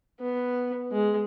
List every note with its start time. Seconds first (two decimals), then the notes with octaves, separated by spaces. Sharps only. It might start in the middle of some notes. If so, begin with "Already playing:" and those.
0.20 B3
0.92 G#3